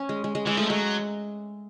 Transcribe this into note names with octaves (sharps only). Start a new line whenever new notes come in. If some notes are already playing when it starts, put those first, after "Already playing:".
Already playing: C#4
G#3
G#3
G#3
E3 G#3
F3 A3
F#3 G#3